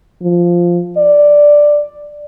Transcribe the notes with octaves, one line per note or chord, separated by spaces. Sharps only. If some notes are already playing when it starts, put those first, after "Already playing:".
F3
D5